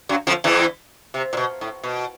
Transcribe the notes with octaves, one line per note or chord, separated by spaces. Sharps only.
F#2 F#3
F2 F3
E2 E3
C3
A#2
B2
A2
B2